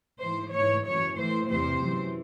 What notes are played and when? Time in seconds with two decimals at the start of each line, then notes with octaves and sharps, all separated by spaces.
0.21 G#2 E3 C5
0.53 G#2 E3 C#5
0.85 F#2 E3 C#5
1.17 A2 E3 C5
1.50 E2 C3 E3 C5
1.82 F#2 E3